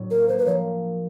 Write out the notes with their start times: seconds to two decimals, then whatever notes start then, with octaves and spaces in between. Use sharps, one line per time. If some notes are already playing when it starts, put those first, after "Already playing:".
Already playing: A2 F#3 D4
0.11 A#3 A#4
0.28 A#3 C5
0.38 B4
0.46 F3 C#5